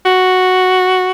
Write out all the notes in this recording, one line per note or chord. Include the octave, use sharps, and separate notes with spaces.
F#4